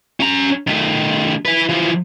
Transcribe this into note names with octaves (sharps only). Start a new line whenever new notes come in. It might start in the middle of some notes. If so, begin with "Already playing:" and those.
C#4 A#5
D#3 A3
E4 B4
E3 F3